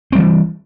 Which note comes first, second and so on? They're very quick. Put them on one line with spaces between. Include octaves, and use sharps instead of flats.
C4 G3 E3